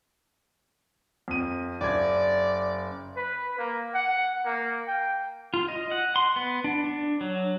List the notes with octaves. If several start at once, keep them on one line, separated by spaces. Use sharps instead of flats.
F2 D#7
F#1 D5 G#6
B4
A#3
F#5
A#3
G5
F4
D#5
F#5
C6
B3
D4
D4
F#3